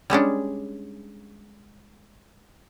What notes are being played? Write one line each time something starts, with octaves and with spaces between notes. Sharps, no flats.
G3 G#3 C#4 D4